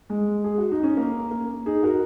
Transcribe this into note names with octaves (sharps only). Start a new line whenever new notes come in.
G#3
G#4
F#4
D#4
C#4
A#3
A#3
D#4 G#4
F#4 A#4